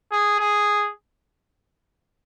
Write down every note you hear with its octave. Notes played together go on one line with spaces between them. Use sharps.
G#4
G#4